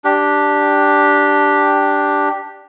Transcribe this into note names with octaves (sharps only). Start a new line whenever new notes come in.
D4 G4